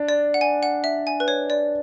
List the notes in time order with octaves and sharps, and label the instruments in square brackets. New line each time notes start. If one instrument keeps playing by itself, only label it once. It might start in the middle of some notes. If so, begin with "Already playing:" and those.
Already playing: [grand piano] D4
[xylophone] D5
F#5
G#5
F#5
E5
G#5
B4
C#5
D5